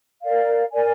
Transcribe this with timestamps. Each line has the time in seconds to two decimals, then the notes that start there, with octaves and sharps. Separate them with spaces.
0.23 A#4 D5 F5
0.73 A#4 D5 G#5